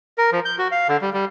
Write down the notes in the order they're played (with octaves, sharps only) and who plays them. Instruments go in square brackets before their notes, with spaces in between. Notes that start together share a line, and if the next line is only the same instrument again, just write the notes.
[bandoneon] A#4
F3
G6
F#4
F5
D3
G3
G3